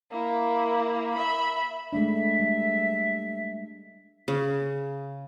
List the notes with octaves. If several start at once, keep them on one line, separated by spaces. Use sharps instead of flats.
A#3 E4
E5 B5
G#3 A3 D4 E5
G3
C#3